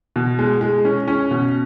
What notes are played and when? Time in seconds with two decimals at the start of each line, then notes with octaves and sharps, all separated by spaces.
0.16 B2
0.39 G#3
0.61 G#3
0.85 C#4
1.08 C#4
1.31 B2